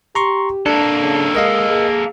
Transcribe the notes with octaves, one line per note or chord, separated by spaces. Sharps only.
G4 A#5 C6 C#6
A#3 D4 A4
C#3
G#3 A#4 D#5 F5
G#4